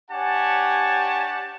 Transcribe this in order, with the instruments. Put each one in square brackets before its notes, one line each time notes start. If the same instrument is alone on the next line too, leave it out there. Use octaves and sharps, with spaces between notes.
[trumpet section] D4 G4 C#5 F#5 G#5 A5